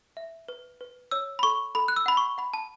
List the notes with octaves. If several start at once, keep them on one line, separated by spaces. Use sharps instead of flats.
E5
B4
B4
C#5 E6
B5
A4 C#6
A4 B5
F#6
E6
F#5 B5
C#6
F#5 B5
A5